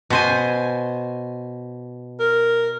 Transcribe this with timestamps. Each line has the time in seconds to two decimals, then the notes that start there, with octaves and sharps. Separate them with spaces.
0.10 B2 C5 G#5
2.20 A#4